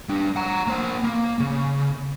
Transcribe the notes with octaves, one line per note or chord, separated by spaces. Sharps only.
G3 D4
F#5 A#5
A#3 C5
A#3
C#3